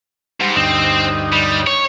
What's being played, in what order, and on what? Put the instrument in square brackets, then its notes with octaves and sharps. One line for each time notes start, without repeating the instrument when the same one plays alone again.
[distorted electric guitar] G#2 [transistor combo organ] G3
[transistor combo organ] D2 G2 D#4 [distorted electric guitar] C4
[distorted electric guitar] G3
C#5